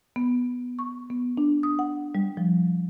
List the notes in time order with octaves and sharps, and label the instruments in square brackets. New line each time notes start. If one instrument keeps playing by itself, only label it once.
[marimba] B3
C#6
B3
D4
D#6
F#5
G3
F3